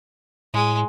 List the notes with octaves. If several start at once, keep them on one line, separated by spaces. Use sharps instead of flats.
A2 G#3